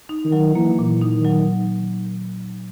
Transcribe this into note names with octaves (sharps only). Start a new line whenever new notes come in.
D#4
D#3
F#3
E3 A#3
A#2
D#4
D#3
F#3